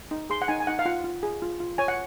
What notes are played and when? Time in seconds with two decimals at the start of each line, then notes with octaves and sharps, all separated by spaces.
0.11 D#4
0.30 G#4 C6
0.42 F#5
0.48 D#4 G#5
0.60 G#5
0.67 D#4 F#5
0.79 F5
0.85 F4 F#5
1.04 F4
1.23 G#4
1.42 F4
1.60 F4
1.78 C#5 G#5
1.88 F#5